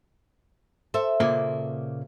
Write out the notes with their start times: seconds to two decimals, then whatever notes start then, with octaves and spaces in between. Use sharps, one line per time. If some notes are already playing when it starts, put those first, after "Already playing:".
0.94 A4 C5 E5
1.20 A#2 C#3 A#3